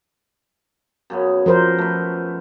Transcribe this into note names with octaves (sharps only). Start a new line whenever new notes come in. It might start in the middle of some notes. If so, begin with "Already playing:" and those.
F#2 C#3 B3
F3 B3 A#4 C5
A3 B4